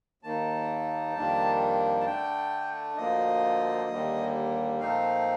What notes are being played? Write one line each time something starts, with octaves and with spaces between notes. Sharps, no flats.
D#2 D#3 A#3 D#4 A5
F2 D#3 G3 A#3 D4
A5
D3 A3 D4 G5
D2 D3 F3 A#3 D#5
D#2 D3 G3 A#3
A#2 F3 A3 C4 D#4 F5